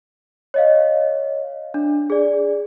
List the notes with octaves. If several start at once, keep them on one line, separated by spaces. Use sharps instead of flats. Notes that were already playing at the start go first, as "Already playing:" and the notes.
C#5 D#5 F5
D4
G#4 D5